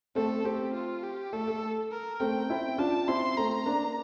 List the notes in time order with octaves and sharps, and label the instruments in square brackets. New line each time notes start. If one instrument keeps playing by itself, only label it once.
[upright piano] A3 C4 [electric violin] A4
[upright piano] A3 C4 [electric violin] G4
[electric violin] F4
G4
[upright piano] A3 [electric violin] A4
[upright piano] A3
[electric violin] A#4
[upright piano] A3 C4 [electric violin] G5
[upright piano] C4 E4
[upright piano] D4 F4 [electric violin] A5
[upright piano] C4 E4 [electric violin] C6
[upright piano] A3 C4 [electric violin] A#5
[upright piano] A#3 D4